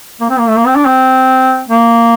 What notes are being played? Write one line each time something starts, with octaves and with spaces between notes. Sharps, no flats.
A#3
C4
A#3
A3
A#3
C4
D4
C4
A#3